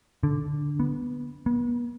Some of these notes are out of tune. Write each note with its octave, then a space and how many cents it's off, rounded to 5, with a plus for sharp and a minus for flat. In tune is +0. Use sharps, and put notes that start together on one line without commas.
D3 -5
B3 -10
B3 -40